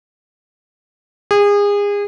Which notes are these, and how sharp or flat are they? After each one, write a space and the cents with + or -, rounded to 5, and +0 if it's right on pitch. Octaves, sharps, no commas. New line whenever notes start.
G#4 -30